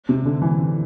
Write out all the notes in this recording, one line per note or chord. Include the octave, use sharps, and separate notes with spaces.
C3
D3
E3